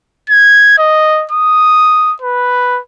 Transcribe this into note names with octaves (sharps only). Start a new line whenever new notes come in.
G#6
D#5
D#6
B4